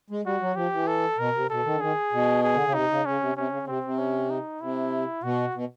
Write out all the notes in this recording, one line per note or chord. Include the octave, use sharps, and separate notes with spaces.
G#3
G3 F#4
F#3
F3 G4
E3
A4
B2 A#4
C3
B2 A4
D#3
D3
D#3 G#4
B2
G#4
D3
C#3
C3 D#4
C#3
C#3 C#4
C3
C3 C#4
C#3
C#3
C3 C4
C3
C#4
D#4
C3 E4
B2 F#4
B2